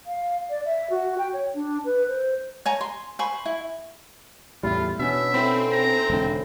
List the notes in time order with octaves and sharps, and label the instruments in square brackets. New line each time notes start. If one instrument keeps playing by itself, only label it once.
[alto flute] F5
D5
E5
F#4
G5
C#5
D4
B4
C5
[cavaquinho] C#5 G#5 A#5
C6
C5 G#5 B5 C#6
E4
[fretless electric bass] E2 A2 G3 [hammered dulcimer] E4 [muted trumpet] F4
[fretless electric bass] B2 [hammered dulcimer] C#4 D4 [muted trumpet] E5
[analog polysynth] C4 [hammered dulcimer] D#4 E4 A4
[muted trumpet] A#5
[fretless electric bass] E1 D3